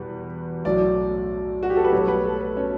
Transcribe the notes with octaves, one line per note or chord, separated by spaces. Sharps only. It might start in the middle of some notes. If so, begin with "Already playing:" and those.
Already playing: E2 B2 G3 B4
B1 A2 F#3 D5
F#4
G4
A4
B4
B1 A2 G3 C#5
B4
A4
B4
C#4